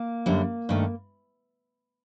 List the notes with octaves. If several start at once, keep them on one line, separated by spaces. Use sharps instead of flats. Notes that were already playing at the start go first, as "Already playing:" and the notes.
Already playing: A#3
F#2 D3 G3
G2 D#3 A3